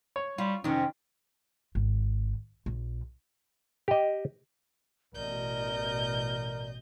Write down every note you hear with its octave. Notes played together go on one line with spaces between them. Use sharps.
C#5
G3 F4
F2 C3 D#3 C#4
G#1
A#1
G4 D#5
A1 B2 A#4 D5 D#5 G6